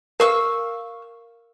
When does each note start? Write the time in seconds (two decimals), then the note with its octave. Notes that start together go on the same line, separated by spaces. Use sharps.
0.20 A#4 F5 C#6 E6